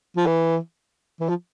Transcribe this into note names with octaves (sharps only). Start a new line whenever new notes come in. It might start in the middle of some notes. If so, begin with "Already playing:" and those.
F3
E3
E3
F3